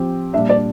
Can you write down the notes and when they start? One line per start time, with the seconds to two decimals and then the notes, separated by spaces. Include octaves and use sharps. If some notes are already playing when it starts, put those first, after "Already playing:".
Already playing: F3 C4 G4
0.33 A#2 G3 D4 E5
0.49 D5